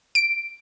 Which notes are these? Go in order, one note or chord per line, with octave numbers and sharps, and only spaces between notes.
D7